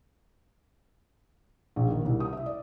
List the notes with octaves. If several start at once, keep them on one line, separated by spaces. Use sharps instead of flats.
A#1
D#3
C2
D#6
E5
D5